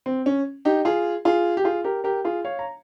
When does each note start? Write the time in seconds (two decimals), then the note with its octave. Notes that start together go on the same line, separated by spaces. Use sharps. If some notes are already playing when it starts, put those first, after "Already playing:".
0.06 C4
0.26 C#4
0.65 D#4 G4
0.85 F4 G#4
1.25 F4 G#4
1.57 G4
1.64 F4 G#4
1.84 G4 A#4
2.04 G4 A#4
2.24 F4 G#4
2.45 C#5 F5
2.59 A#5